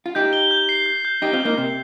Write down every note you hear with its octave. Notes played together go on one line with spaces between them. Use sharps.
F4
D#4 G4 G6
G7
G6
C7
G6
G6
D#4 G4 G7
C4 F4
G6
A#3 D#4
C3 C7